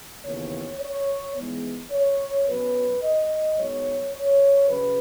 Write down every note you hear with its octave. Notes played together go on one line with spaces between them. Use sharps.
D#2 C#3 E3 B3 C#5
C#5
G#2 E3 G#3 B3
C#5
B2 F#3 C#4 B4
D#5
G#2 F#3 B3 C#5
C#5
C#3 F#3 C#4 B4